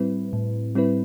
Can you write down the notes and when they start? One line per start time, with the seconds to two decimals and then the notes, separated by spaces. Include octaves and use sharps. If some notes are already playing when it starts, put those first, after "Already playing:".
Already playing: A2 G3 C4 E4 B4
0.33 A2
0.75 G3 C4 E4 B4